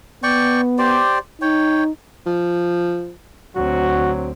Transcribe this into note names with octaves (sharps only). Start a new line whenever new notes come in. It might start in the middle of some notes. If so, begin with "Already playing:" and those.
B3 D5 G5 C#6
G4 C5 D5
D#4 C#5 G5
F3
D2 F#3 C4 F#4